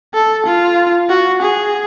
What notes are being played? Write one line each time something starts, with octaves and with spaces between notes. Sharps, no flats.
A4
F4
F#4
G#4